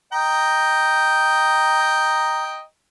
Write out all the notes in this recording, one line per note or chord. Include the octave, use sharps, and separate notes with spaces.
D#5 G5 A#5